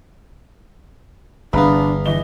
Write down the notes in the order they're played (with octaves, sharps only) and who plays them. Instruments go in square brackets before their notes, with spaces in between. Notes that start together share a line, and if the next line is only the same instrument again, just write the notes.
[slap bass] G1 [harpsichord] E2 B3 [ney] D4 [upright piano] F5 A#5 B5
[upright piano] E3 G7 [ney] D#5